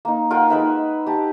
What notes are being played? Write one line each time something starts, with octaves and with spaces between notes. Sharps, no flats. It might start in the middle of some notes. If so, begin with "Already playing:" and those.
A#3 D#4
F4 A#4 F#5 G5
G#3 D#4 B4 E5
G4 A5